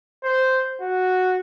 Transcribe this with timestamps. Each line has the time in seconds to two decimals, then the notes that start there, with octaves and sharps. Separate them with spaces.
0.24 C5
0.81 F#4